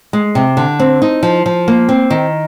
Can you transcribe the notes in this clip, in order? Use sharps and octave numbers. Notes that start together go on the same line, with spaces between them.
G#3
C3
D3
C4
D#4
F3
F3
A#3
C4
D#3